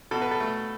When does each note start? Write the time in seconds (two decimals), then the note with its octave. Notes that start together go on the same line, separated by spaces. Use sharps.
0.11 B2 A4
0.22 B4
0.31 A4
0.40 A3